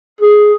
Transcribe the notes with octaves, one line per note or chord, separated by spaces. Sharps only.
G#4